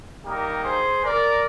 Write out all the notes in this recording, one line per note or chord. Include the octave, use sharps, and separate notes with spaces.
G3 A#3 D#4 G4 A#4
G#4 C5
A#4 D5